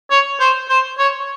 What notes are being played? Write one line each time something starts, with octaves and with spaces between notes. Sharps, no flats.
C#5
C5
C5
C#5